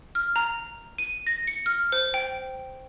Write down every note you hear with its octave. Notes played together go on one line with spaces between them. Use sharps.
F6
A#5
D#7
A#6
C#7
F6
C5
G5